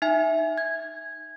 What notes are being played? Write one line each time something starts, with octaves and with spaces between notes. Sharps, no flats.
D#4 E5 G#5
G#6